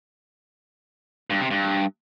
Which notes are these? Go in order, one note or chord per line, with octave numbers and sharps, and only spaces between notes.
G2
C3
G2